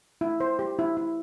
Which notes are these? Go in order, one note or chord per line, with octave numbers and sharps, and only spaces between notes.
E4
C5
G4
E4
E4